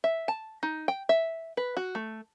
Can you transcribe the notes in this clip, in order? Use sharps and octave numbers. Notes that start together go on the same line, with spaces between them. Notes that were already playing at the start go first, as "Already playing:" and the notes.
E5
A5
D#4
G5
E5
B4
F#4
A3